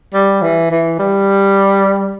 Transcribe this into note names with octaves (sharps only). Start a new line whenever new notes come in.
G3
E3
E3
G3